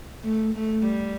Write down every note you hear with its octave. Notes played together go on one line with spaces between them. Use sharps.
A3
A3
G3